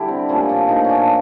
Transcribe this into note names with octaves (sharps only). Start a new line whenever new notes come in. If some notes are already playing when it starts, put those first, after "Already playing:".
Already playing: D3 G3 E4 G4
C4
A#2 F3 A3 C#4
D4
A#2 F3 A3 D#4
C#4 D4